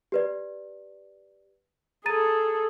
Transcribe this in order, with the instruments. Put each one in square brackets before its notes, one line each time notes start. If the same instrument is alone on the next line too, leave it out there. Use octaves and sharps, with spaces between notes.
[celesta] G4 B4 D5
[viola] G#4 A4 [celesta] A#5 A6 D#7